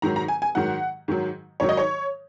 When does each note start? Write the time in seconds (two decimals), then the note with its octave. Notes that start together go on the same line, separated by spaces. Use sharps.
0.02 G#2 D#3 F#3 A#5
0.16 A#5
0.28 G#5
0.42 G#5
0.55 G#2 D#3 F#3 F#5
1.08 G#2 D#3 F#3
1.60 G#2 D#3 F#3 C#5
1.69 D#5
1.77 C#5